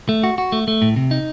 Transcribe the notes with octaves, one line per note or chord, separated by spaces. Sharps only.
A3
F#4
F#4
A3
A3
A2
C3
D#4